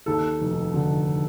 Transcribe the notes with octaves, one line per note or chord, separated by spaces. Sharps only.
D#2 A4
F1
D3